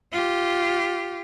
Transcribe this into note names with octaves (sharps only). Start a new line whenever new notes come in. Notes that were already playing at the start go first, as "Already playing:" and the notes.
F4 G4